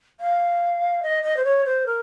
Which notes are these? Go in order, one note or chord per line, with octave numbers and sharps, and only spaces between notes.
F5
D#5
D#5
C5
C#5
C5
A#4